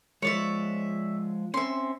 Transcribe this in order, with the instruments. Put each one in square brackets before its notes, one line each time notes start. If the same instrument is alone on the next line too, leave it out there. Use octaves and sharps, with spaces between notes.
[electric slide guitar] F3 G#3 [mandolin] C#5 D5 E5
[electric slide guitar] C4 C#4 [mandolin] E5 C6